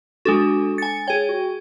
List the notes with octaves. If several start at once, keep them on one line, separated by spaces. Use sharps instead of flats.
G#3 D4 F#4 A4
G#5 A6 C#7
G#4 C#5 G5
F#4